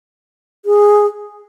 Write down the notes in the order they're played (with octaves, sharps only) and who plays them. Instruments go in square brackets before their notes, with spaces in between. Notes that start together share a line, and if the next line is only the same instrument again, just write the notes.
[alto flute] G#4